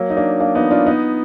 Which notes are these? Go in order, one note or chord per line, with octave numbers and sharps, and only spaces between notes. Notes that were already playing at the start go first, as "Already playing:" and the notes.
Already playing: F#3 A#3
D#4
A#3 D4
A#3 D4
B3 D#4
D4 F4
B3 D#4